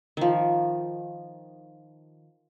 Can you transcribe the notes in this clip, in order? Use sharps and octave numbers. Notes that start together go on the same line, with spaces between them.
D#3 F3